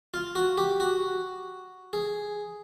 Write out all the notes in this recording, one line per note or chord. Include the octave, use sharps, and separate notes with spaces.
F4
F#4
G4
F#4
G#4